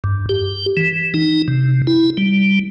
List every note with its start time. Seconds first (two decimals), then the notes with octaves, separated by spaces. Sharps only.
0.04 G2
0.29 G4
0.77 E3
1.14 D#4
1.48 C3
1.87 E4
2.17 G3